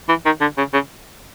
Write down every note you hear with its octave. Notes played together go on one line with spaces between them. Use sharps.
E3
D#3
D3
C#3
C#3